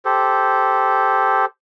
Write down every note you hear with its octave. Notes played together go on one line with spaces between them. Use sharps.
G4 A4 C5